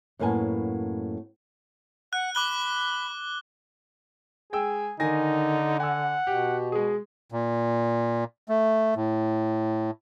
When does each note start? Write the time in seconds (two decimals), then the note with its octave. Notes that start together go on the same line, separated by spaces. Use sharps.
0.19 F#2 A2 A#3 B3 G#5 A5
2.13 F#5 F#6
2.35 B5 D6 F#6 G7
4.53 G#3 G#4 G5 E6
5.00 D3 D#3 D#4 G#5 A#6
5.80 F#5 G#5 E6
6.27 B2 G4
6.72 G#3 G#4
7.32 A#2
8.49 A3
8.96 A2